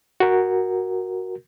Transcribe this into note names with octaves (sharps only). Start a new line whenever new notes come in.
F#4 A#4